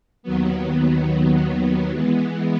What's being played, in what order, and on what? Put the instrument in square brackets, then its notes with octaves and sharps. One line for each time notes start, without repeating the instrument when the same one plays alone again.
[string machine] D#2 D#3 F#3 B3
E3 G#3 B3